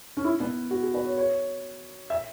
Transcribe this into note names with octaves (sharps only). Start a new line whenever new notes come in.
C#4
E4
B3
F#4
G#4
B4
C#5
C#5
E5